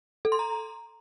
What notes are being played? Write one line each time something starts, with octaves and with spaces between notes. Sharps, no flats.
A4
C6
A#5